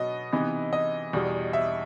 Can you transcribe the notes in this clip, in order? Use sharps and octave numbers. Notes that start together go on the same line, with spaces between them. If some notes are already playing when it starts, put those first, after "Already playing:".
Already playing: B2 F#3 B3 D#5
C3 E3 B3 D#4
D#5
E2 B2 G3
E5